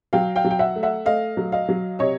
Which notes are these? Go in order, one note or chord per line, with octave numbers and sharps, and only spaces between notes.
F#3 F5 G5
F5 G5
F#3
G5
E5 F#5
A3
E5 F#5
A3 D#5 F5
F#3
D#5 F5
F#3
C3 C#5 D#5